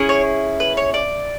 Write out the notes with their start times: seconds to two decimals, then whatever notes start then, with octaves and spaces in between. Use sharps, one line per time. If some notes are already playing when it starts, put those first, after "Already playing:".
Already playing: C#4 E4 G#4
0.09 C#5
0.60 B4
0.77 C#5
0.94 D5